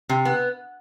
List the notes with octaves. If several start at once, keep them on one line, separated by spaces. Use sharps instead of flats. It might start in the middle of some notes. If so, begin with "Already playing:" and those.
C3
B3